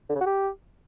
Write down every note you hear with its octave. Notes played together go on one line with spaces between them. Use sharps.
D3
C#3
F#4
G4